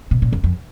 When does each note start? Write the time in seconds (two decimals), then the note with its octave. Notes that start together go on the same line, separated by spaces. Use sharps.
0.11 B2
0.22 A#2
0.33 E2
0.44 F2